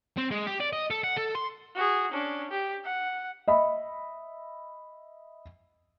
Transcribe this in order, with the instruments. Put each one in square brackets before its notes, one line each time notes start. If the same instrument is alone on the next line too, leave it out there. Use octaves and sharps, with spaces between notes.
[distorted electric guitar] C4
G#3
G4
D5
D#5
A4
F#5
A4
C6
[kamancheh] F#4 G#4
C#4 D4
G4
F#5
[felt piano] D#5 E5 B5